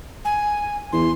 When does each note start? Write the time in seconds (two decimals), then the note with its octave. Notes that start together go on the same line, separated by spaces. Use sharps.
0.25 G#5
0.92 E2 C6